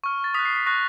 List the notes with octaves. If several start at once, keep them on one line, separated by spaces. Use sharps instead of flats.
C#6 F6
A6
D#6 F#6 B6
C7
B6
C#6 F#6 A#6